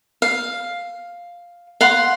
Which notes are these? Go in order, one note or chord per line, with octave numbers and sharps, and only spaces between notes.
F5
F5 F#5 C6